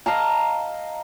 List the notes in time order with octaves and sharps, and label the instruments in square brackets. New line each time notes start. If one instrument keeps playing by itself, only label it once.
[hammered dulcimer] D#5 F5 A5 A#5